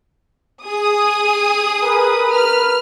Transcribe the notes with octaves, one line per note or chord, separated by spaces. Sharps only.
G#4 D#6
A#4 B4
F6